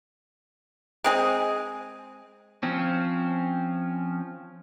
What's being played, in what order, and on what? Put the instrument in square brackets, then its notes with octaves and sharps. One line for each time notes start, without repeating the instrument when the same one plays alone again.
[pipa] G#3 C4 G#4
[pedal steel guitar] F3 C4 C#4